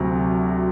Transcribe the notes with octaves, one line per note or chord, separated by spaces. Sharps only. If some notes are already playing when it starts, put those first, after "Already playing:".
Already playing: D2 C3 F#3